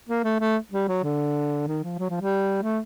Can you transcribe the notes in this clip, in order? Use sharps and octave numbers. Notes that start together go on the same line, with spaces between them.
A#3
A3
A3
G3
F#3
D3
D#3
F3
F#3
F3
G3
A3